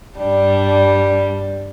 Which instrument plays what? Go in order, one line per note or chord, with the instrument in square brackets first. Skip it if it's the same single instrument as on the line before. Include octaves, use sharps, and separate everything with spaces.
[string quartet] G2 G3 D4